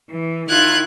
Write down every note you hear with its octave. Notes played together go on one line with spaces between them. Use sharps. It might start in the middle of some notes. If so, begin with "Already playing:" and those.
E3
D#3 E4 F4 F#6 G#6